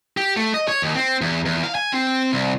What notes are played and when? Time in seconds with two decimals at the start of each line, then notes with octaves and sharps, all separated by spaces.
0.17 G4
0.37 A3
0.54 D#5
0.68 C#5
0.82 D#2
0.95 C4
1.22 E2
1.46 E2
1.63 F5
1.75 G#5
1.93 C4
2.33 C2